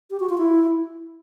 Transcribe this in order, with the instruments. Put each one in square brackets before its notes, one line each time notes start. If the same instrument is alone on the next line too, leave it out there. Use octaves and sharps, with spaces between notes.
[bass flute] G4
F#4
F4
E4